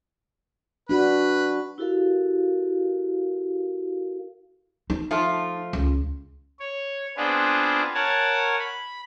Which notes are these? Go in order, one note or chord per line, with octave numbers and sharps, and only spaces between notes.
D4 F#4 B4
E4 F#4 G4 A4 A#4 F5
D#4
F3 A3 F4
C#2
C#5
B3 C4 D4 F4 G#4 B4
A#4 C#5 F#5 G#5 A5
B5